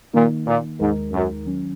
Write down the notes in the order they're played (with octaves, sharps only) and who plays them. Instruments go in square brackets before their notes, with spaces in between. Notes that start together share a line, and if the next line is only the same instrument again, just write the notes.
[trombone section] A#2 [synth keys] D#3 A#3 D#4
[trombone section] A#2
[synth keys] D#2 D#3 G#3 D#4 A#4 [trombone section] G#2
[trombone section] F#2
[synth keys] D#3 F#3 C#4